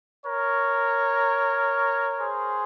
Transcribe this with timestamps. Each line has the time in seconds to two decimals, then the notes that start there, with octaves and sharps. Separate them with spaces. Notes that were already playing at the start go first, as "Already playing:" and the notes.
0.25 A#4 C#5
2.19 G#4 C5